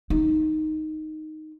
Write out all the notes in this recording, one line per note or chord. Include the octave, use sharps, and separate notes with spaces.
D#4